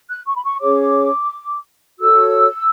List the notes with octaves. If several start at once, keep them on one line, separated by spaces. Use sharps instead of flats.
F#6
C#6
B5
C#6
C#4 G#4 C#5 D6
F#4 A4 C#5 E6